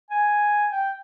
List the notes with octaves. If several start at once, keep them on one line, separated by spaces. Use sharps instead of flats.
G#5
G5